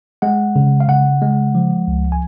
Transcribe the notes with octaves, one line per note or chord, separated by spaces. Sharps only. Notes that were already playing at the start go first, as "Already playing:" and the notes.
G#3 F#5
C#3
F5
C#3 F#5
G#3
F3
C#2
G#5